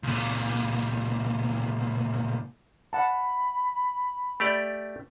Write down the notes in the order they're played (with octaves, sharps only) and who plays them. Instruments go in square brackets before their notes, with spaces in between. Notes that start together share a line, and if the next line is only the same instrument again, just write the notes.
[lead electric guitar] C#2 A#2
[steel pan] F#5 A5 [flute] B5
[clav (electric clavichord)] A3 G4 D5